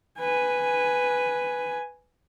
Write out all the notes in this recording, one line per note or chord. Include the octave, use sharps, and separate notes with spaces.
B4 G#5